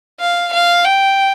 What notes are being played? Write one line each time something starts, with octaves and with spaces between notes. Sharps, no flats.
F5
F5
G5